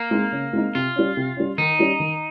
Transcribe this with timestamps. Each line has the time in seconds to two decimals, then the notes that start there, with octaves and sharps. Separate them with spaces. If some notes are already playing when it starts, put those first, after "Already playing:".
Already playing: A#3
0.11 G#3 C4 D#4
0.32 C#3
0.53 G#3 C4 D#4
0.75 C3 F4
0.96 G3 C#4
1.17 C3
1.37 G3 C#4
1.58 D#3 D#4
1.79 G3 C#4
2.00 D#3